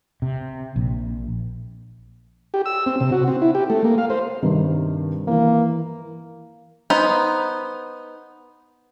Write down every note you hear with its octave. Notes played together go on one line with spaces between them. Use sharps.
C3
A#1
G4
E6
C4
C3
F#4
C4
E4
G4
A3
A#3
F5
C5
G2 C3 D#3
E3 A#3 A#4
B3 D#4 C5